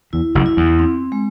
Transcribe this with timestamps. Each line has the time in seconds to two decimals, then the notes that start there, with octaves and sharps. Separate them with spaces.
0.13 E2 E4
0.35 F#1 F#2
0.46 E4
0.57 E2
0.79 C4
1.12 G#3